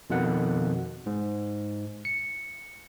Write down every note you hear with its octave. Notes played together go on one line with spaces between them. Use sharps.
F2 B2 D#3 F#5
G#2
C#7